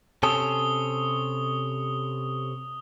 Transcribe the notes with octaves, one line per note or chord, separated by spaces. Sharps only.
C3 C#4 A4 D#6 G7